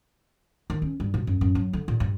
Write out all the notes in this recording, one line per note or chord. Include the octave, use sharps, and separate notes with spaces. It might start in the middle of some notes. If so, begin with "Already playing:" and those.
D#3
C#4
G2
B2
F#2
F#2
F#3
D3
A#2
G2